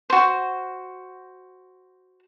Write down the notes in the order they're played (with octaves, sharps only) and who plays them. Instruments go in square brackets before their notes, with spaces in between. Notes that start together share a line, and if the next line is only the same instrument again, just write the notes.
[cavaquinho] F#4 C5